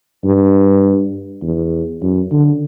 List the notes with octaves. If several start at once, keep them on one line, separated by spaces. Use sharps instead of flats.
G2
E2
F#2
D3